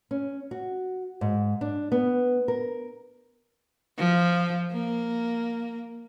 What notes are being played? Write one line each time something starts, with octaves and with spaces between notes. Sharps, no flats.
C#4
F#4
G#2
D4
B3
A#4
F3
A#3